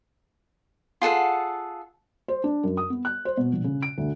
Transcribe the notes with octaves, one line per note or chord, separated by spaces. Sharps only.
F4 G#4 A4 F#5
C5
D4
F#2
D#6
B3
F#6
C5
B2
A#1
C#3
D7
D2